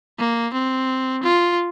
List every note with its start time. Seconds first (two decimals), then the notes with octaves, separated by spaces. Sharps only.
0.19 A#3
0.54 C4
1.24 F4